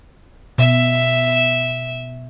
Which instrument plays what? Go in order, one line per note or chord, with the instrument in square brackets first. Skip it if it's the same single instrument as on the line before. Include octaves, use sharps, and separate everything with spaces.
[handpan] B2 [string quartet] E5